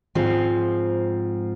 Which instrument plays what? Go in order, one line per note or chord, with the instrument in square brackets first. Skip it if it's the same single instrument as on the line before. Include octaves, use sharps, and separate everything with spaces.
[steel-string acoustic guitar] G#2 F3 C4